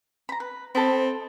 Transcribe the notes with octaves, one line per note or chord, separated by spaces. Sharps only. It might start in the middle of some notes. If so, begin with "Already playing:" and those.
A#5 B5
B4
C4 A4 D#5 B5